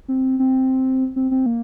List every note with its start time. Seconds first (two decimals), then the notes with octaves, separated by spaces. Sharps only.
0.08 C4
0.39 C4
1.16 C4
1.31 C4
1.46 A#3